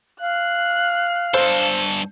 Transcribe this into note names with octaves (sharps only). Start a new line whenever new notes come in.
F5 F#6
G2 A4 C5